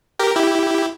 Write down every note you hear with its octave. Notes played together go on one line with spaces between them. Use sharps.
G4 A#4
E4 G4